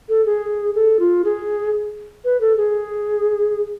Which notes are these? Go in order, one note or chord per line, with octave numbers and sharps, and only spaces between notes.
A4
G#4
A4
F4
G#4
B4
A4
G#4